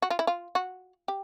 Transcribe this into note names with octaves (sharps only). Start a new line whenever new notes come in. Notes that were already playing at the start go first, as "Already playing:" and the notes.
F#4
F4
E4
F4
F#4
G4